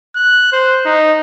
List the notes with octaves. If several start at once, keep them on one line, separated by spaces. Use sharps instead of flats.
F#6
C5
D#4